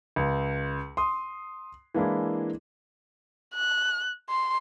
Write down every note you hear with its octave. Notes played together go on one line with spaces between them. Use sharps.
C#2
C6 D#6
E3 G#3 A#3 D4 E4
F#6
C6